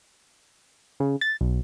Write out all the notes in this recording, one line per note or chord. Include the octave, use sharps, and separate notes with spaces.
C#3
A6
B1